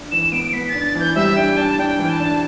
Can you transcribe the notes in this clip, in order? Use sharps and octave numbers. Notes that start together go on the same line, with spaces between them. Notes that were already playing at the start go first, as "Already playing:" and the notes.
Already playing: D4
E3 E7
B3 D7
B3 B6
A6
D4
A6
E3 G6
G3 E5
D4 G5
D4 A5
D4 G5
E3
A5
D4